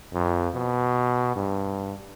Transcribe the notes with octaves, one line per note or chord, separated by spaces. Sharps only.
F2
B2
G2